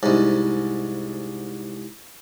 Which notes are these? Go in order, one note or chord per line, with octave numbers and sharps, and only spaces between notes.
C2 G#2